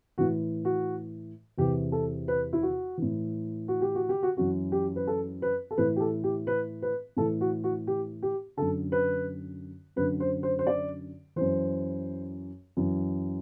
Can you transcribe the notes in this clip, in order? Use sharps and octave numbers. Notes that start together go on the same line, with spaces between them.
A2 E3 F#4
F#4
E2 C3 E3 G4
A4
B4
E4
F#4
A2 E3
F#4
G4
F#4
G4
F#4
F#2 E3 F#4
G4
B4
A4
B4
A4
A2 E3 B4
G4
A4
G4
B4
B4
A2 E3 A4
F#4
F#4
G4
G4
F#2 D3 A4
B4
F#2 D3 B4
C5
C5
C5
D5
F#2 E3 C5
F#2 E3